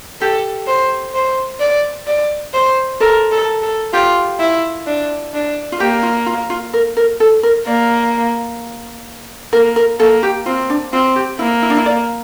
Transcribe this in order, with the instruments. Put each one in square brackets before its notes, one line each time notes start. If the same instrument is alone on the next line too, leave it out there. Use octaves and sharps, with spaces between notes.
[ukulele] G4 [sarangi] A4
[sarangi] C5
C5
D5
D5
C5
[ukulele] A4 [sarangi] A#4
[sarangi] A4
A4
[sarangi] F4 [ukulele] G4
[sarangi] E4
D4
D4
[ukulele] F4
[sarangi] A#3 [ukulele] G4
[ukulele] F4
F4
F4
A#4
A#4
A4
A#4
[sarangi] A#3 [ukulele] D5
[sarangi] A#3 [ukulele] A#4
[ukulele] A#4
[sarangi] A#3 [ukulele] A4
[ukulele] G4
[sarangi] C4 [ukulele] F4
[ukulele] D4
[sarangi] C4 [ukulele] F4
[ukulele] G4
[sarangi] A#3 [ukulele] E4
[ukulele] E4
D4
E4
D5